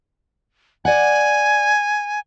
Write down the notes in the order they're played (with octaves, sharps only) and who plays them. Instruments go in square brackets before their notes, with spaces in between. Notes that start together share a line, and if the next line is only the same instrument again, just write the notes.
[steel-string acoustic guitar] D5 F#5 [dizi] G#5